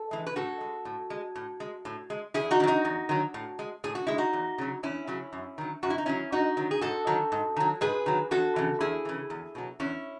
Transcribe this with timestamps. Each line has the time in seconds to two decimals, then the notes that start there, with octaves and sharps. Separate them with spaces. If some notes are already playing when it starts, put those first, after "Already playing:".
Already playing: A4
0.11 E3 G#3
0.26 B4
0.36 A2 F#4 A4
0.61 G#3
0.85 A2
1.10 G#3
1.35 A2
1.60 G#3
1.85 A2
2.10 G#3
2.34 E2 E4 G#4
2.51 D#4 F#4
2.60 D#3 F#3
2.67 D#4 F#4
2.85 E2
3.09 D#3 F#3
3.34 A2
3.59 G#3
3.84 A2 G#4
3.95 F#4
4.07 G#3 E4
4.18 D#4 F#4
4.33 E2
4.58 C#3 F#3
4.83 E2 C#4 E4
5.07 C#3 F#3
5.33 F#2
5.58 D#3 F#3
5.83 F#2 F#4
5.90 E4
5.98 D#4
6.06 D#3 F#3 C#4 E4
6.32 G#2 D#4 F#4
6.57 D#3 F#3
6.71 G#4
6.81 G#2 F#4 A4
7.07 D#3 F#3
7.32 G#2
7.56 D#3 F#3
7.81 G#2 G#4 B4
8.06 D#3 F#3
8.31 E2 F#4 A4
8.56 C#3 E3
8.80 E2 E4 G#4
9.05 C#3 E3
9.30 E2
9.55 B2 F#3
9.80 E2 C#4 E4